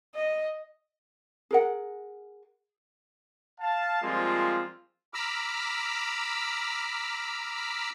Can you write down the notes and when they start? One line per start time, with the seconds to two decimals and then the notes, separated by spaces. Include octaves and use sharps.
0.15 D#5
1.51 G#4 A#4 F#5
3.61 F5 A5
4.02 F3 G3 G#3 A#3 C4 F4
5.14 A#5 B5 D6 E6 F6